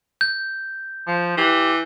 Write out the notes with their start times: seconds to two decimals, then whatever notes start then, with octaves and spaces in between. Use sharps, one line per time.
0.21 G6
1.07 F3
1.38 E3 G4